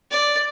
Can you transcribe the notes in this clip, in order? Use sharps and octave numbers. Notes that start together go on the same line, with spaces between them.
D5